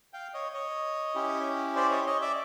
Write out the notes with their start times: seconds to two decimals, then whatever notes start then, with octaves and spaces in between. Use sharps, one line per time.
0.13 F5 G5
0.34 C#5 D#5
0.54 C#5 D#5
1.15 C#4 E4 G4
1.76 C5 D5
1.91 C#5 D#5
2.07 C#5 D#5
2.21 D5 E5